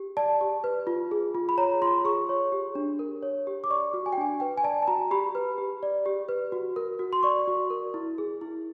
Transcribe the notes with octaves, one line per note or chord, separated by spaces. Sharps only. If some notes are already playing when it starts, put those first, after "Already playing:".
Already playing: G4
D5 A5
G4
B4
F4
G#4
F4
B5
C#5 A#5
F4 C6
G#4 C#6
C#5
G4
D4
A#4
C#5
G4
D6
D5 C#6
F#4
G#5
G5
D4 G#5
B4 G5
G#5
D5 A5
A5
F#4 A#5
G4 B5
B4
G4
D5
G4
B4
F#4
A#4
F#4
C6
D5 C#6
F#4
A#4
E4
G#4
E4